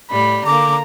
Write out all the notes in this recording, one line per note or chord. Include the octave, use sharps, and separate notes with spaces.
A2 G3 B5
D3 A#3 A#5 D6